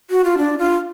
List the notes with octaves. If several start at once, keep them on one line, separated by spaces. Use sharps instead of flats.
F#4
F4
D4
F4